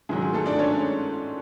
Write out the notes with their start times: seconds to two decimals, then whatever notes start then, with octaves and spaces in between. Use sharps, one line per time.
0.09 G#2 D#3 F#3 G#4
0.22 G#4
0.33 A3 A4
0.46 D4 D5
0.59 C#4 C#5